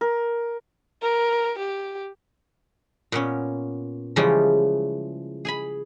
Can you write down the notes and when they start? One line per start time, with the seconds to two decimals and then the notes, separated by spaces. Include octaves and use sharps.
0.01 A#4
1.02 A#4
1.59 G4
3.12 A#2 B3 C#4
4.16 C#3 E3 F3 G3 G#3 C#4
5.45 G#4 G#5 B5